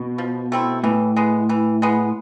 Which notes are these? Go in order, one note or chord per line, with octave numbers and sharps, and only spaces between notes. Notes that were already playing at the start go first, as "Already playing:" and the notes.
Already playing: B2
F3
A3 C4 E4
A2 E3
G#3 B3
E3
G#3 B3